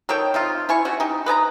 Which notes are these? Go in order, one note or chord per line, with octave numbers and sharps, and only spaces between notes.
D#3 A4 C#5 G5
C3 D#4 F4
E4 G#5 C#6
A3 C#4 F#4
D#4 G4
B4 D#5 G#5 A#5